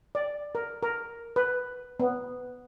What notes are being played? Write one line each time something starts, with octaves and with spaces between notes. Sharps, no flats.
D5
A#4
A#4
B4
B3